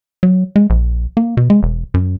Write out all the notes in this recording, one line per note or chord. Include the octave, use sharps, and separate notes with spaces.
F#3
G#3
A#1
A#3
B2
G#3
E1
F#2